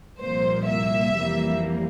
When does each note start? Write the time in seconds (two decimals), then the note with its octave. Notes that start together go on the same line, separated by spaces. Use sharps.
0.19 C2 A#2 F3 A#3 C5
0.68 E5
1.16 F2 E3 G3 A#3